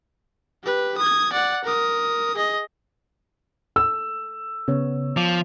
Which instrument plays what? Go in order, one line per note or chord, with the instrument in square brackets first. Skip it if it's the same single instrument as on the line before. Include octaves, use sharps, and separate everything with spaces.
[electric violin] G4 B4
D#6 G#6
D5 F#5
A#4 D#6
G#4 D#5
[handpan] A4 [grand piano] E6
[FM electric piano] C#3 [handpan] B3 C#5
[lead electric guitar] F3 [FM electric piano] D6